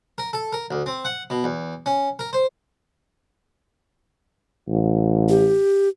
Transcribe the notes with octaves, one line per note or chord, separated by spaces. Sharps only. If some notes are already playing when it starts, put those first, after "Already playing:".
A#4
A4
A#4
D2
C4
F#5
B2
E2
C#4
A#4
C5
A1
G4